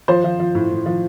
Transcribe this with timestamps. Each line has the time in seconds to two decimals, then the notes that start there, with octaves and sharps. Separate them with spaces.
0.08 F3 C5
0.24 F3
0.40 F3
0.55 A2
0.71 A2
0.86 F3